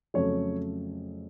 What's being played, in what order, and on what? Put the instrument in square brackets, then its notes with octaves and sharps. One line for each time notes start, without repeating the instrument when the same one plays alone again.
[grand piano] F2 C#3 F#3 A3 C#5